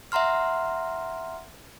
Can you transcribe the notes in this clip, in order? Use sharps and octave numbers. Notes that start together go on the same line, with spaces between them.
E5 F#5 A#5 C6 F6